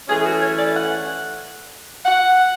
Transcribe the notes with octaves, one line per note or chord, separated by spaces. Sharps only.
E3 A3 C#4 G#4
F#4
C#5
D5
F#5
F#5